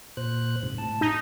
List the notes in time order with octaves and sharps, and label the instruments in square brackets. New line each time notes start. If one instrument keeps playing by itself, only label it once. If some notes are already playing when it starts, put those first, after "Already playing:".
[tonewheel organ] A#2 C5 F#6
G#2 C3
A2 A5
[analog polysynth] D#4